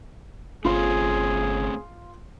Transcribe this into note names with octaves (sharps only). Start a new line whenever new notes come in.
G1 A3 C4 C#4 F4 G#4 C6